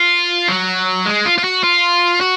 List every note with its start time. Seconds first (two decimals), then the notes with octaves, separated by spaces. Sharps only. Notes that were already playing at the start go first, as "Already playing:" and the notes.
Already playing: F4
0.48 F#3
1.06 G#3
1.26 F4
1.38 F4
1.44 F#4
1.64 F4
2.21 F#4